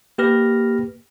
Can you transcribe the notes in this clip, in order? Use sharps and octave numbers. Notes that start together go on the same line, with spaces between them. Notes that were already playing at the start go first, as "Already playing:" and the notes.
A#3 G4 B4 F6 A#6